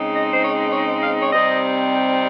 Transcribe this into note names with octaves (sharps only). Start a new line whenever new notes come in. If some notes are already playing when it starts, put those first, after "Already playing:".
Already playing: C#3 G#3 C4 D#4
D#5
C5
C#5
C#5
F5
C#5
C3 G3 C4 D#4 D#5